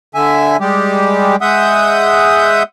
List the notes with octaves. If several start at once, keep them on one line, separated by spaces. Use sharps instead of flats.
D3 E5 G#5
G3 G#3 G4
G#3 E5 F#5 D#6 G6